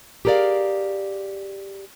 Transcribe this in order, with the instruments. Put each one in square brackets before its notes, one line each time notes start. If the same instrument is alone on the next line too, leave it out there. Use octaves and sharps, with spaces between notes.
[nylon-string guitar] G4 G#4 A#4 C#5 D5 F5